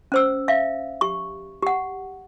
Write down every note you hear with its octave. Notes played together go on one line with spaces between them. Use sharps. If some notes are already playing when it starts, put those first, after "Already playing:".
C#4 C5 E6
E5 F5
G4 C#6
G4 F#5